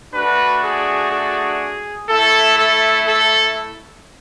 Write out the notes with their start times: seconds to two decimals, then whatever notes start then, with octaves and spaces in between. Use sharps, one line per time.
0.14 A3 D4 F#4 B4
0.63 G#4
1.11 G#4
2.09 A3 E4 A4
2.58 A4
3.07 A4